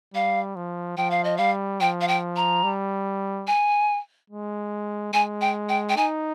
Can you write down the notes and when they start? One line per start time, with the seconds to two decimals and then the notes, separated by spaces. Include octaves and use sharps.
0.14 G3 F5
0.56 F3
0.97 F3 G5
1.11 F5
1.24 D#5
1.37 G3 F5
1.81 F3 G5
2.01 F5
2.08 G5
2.36 A#5
2.64 G3
3.47 G#5
4.31 G#3
5.13 G#3 G#5
5.41 G5
5.69 G5
5.89 G5
5.97 D#4 G#5